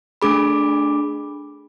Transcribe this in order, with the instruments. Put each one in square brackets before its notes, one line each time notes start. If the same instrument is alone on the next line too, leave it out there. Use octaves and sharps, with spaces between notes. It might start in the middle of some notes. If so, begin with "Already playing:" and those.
[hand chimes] A3 D4 G#4 B5 D6